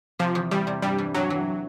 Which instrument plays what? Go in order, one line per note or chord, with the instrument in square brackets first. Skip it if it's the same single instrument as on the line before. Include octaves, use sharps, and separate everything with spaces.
[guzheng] C3 [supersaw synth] F3
[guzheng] E2
[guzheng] E2 [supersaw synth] G3
[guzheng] C3
[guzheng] G2 [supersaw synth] G3
[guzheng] E3
[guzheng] G2 [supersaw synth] F#3
[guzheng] E3